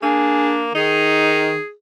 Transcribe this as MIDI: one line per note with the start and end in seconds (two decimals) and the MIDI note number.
0.03 0.71 58
0.03 0.69 62
0.03 0.53 68
0.75 1.55 51
0.75 1.62 63
0.75 1.72 68